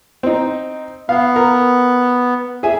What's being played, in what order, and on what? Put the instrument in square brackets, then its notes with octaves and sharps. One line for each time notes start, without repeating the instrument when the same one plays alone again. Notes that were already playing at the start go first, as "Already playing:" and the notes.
[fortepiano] C4 D#4
[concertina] B3 [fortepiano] F5
[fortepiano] A#4
G#4 E5 G#5